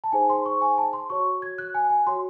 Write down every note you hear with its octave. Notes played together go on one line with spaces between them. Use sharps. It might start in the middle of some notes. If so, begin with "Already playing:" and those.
A5
D#4 G#4 C5 G#5
C6
C#6
G#5
A5
C6
F#4 C#5 C#6
G#6
F#6
G#5
G#5
F#4 C#5 C6